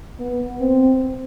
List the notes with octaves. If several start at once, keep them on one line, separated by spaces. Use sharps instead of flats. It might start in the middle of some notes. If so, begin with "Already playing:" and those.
B3
C4